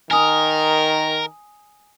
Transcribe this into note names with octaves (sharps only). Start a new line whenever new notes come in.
D#3 A#4 G#5 D#6 F7